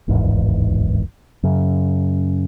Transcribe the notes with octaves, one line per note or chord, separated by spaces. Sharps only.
D1 G#1 E2 G#2
F#2 C#3